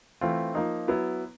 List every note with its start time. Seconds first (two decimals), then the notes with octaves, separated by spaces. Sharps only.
0.21 E3 A3 C4 F4
0.55 F3 A#3 D#4
0.88 F#3 B3 E4